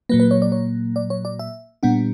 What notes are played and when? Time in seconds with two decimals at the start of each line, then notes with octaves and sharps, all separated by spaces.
0.09 A#2 F#3 A#3 B4
0.20 B4
0.31 C#5
0.42 D5
0.52 C#5
0.96 D5
1.10 C#5
1.25 D5
1.39 E5
1.83 A#2 G3 B3 D4 F#5